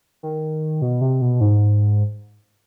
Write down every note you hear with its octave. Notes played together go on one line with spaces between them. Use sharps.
D#3
B2
C3
B2
G#2